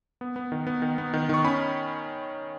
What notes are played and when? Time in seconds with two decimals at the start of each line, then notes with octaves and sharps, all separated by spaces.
0.21 B3
0.36 B3
0.52 D#3
0.67 B3
0.82 D#3
0.98 B3
1.14 D#3
1.29 D#3 C#6
1.44 C#4 B5